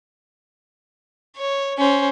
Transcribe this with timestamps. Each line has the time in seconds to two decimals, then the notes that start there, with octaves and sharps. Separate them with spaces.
1.37 C#5
1.77 C#4 C5